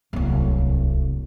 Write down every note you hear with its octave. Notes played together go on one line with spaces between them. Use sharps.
D1 C2